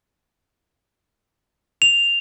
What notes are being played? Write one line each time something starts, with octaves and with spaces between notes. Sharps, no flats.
F7